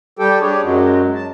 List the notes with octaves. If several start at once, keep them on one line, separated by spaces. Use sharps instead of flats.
G3 G4 A4 G5
D4 G4 G#4 C#5
F#2 F#3 G#3
A5